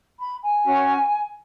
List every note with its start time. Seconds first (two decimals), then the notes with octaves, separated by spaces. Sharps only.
0.19 B5
0.42 G#5
0.65 C#4 F#4 C#5